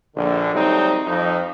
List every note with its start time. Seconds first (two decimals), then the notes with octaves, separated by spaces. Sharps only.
0.16 A#1 D3
0.53 D#3 F#3 G3 A3 C4 D#4
1.06 F2 F3 D#4